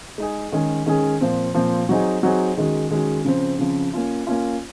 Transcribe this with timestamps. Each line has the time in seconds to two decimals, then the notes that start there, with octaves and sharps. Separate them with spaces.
0.18 G#3 D#4 G#4
0.52 D#3 G#3 C#4 G#4
0.86 D#3 G#3 C#4 G#4
1.21 A#2 F3 C4
1.54 A#2 F3 C4
1.89 F#3 C4 D#4 G#4
2.23 F#3 C4 D#4 G#4
2.57 D#3 G#3 C#4 F#4
2.91 D#3 G#3 C#4 F#4
3.25 C#3 F3 C4
3.59 C#3 F3 C4
3.94 A#3 C#4 F4
4.27 A#3 C#4 F4